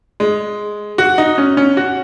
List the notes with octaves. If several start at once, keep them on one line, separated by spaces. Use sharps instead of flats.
G#3
F#4
D#4
C#4
C#4
F#4